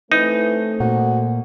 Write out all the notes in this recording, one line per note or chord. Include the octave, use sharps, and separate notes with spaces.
E3 A3 C4 D#4
A#2 F#4